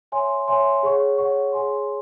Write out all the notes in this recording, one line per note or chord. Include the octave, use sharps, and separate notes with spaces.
C#5 E5 G#5 C6
C#5 E5 G#5 C6
G#4 C#5 F#5 C#6
G#4 C#5 F#5 C#6
G#4 C#5 G#5 C6